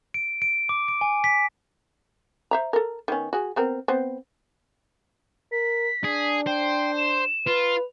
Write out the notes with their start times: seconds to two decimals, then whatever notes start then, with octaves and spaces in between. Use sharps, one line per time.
0.14 D7
0.42 D7
0.69 D6
0.88 D7
1.01 G#5
1.24 B6
2.51 C5 E5 A#5
2.73 A4 A#4
3.08 D#3 B3 C#4
3.33 F#4 G#4
3.56 B3 C4 A#4
3.88 B3 C4 C5
5.52 A#4 B6
6.04 D4 G#4
6.47 C5 G5
6.97 E7
7.47 F4 B4